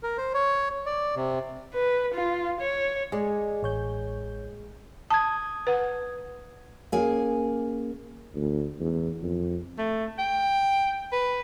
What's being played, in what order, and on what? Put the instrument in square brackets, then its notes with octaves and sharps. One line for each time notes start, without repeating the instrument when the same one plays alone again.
[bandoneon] A#4
C5
C#5
D5
C3
[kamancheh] B4
F4
C#5
[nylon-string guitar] G#3 [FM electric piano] G#4 D5 D#5
[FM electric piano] A1 C#5 G6
[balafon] A5 [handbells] D#6 G#6
[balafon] B4 F#5
[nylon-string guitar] A#3 C#4 G#4
[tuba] D2
E2
F2
[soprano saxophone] A3
G5
B4